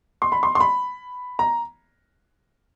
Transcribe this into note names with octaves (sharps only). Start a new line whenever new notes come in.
C6
B5
C6
C6
B5
A#5